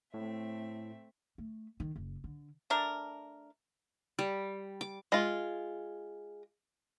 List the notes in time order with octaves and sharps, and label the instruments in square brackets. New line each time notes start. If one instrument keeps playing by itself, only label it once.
[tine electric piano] A2 [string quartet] A3 C4 E5
[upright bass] A3
D#3
F#1
D3
[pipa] A3 D4 A#4
[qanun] G3
D6
[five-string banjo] G#3 F4